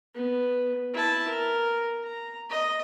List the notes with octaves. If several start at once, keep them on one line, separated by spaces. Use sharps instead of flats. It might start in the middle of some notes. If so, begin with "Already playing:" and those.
B3
E4 A5
A#4
A#5
D#5